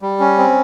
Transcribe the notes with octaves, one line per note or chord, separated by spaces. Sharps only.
G3
C#4
C4